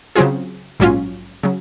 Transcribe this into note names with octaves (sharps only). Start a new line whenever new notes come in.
C#3 F#3 C4 F4 G#4
A#1 G#2 F#3 C#4 F4
C#3 F#3